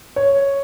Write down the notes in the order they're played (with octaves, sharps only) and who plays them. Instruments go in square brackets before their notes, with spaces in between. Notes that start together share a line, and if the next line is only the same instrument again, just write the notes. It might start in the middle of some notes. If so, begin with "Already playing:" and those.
[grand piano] C#5